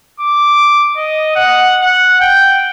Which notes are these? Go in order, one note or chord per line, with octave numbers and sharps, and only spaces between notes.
D6
D#5
F#5
F#5
G5